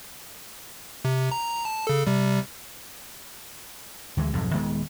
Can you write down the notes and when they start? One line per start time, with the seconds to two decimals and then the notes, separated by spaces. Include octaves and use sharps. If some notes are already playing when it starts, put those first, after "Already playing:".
1.05 C3
1.32 A#5
1.65 A5
1.87 C#3 A4
2.07 C3 G3
4.17 D2 E3 G#3
4.33 B1 F2 G#2
4.54 D#1 D#3 G#3 B3